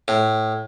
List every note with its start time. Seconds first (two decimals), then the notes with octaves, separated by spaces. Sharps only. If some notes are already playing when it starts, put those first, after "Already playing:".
0.08 A2